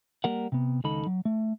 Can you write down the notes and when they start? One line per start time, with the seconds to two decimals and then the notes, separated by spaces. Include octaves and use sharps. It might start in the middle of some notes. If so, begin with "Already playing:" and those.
0.24 G3 A#3 A#4 F#5
0.52 C3 B3
0.84 C#2 D#3 D#4 A4 B5
1.07 F#3
1.25 A3